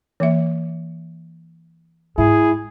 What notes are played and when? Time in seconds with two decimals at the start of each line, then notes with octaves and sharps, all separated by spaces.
0.20 E3 A#3 E5
2.18 G#2 E4 G#4